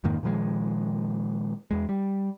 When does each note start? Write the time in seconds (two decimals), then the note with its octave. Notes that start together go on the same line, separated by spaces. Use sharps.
0.04 F2 G#2 D#3 A#3
0.23 A#2 D#3 F3 G#3
1.71 E2 G#3
1.89 G3